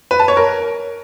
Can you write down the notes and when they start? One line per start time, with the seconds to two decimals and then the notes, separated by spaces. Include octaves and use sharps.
0.11 B4
0.19 A5
0.28 C#5
0.37 A#4